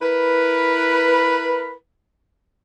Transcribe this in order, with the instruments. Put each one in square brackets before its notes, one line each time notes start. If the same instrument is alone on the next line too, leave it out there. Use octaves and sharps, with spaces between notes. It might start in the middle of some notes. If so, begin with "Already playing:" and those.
[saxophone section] E4 A#4 B4